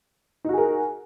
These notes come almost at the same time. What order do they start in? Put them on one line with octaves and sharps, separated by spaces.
D#4 F#4 G#4 A#4